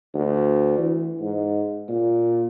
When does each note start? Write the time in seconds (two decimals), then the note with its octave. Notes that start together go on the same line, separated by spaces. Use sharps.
0.14 D2
0.79 E3
1.20 G#2
1.89 A#2